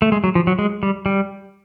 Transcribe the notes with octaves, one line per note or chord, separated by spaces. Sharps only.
A3
G#3
F#3
F3
F#3
G#3
G3
G3